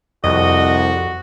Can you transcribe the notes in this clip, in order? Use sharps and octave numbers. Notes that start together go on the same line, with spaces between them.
C2 F2 F#4 D#5